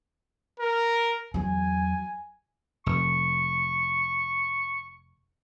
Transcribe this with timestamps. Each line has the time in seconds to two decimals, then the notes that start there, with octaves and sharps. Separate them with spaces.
0.59 A#4
1.34 E2 F#3 G#5
2.86 F1 C#6